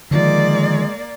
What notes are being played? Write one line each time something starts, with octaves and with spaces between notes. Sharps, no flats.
D3 D#3 F3 G#3 A#3 D5